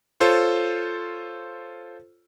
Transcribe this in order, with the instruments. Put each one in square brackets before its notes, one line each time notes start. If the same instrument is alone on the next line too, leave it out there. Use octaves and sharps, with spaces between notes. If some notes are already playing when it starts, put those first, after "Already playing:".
[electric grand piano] F4 A4 C5 C#5